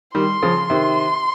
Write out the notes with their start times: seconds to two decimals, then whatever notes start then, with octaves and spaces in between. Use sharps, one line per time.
0.14 D#3 G3 C6
0.42 C#3 F3
0.70 C3 D#3